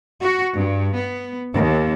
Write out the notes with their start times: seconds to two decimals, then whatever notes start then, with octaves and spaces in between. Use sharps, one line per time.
0.21 F#4
0.56 G2
0.98 B3
1.54 D#2